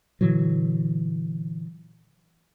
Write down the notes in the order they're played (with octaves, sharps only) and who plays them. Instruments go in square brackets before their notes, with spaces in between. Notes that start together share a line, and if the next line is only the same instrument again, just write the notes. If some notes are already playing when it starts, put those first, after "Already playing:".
[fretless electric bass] A#2 D3 E3 F#3